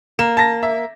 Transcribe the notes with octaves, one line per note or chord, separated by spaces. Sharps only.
A#3 E7
A5 A#6
E5